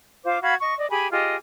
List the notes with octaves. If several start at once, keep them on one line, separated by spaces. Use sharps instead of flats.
F4 C5 F5 D6
F#4 F5 B5 G#6
D#5 C#6
D5 D#5
G4 G#4 G#5 B5
F4 G4 G#4 D#5